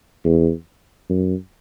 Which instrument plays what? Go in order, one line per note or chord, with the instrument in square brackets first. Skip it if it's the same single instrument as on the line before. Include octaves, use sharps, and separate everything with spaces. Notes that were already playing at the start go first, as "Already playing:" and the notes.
[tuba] E2
F#2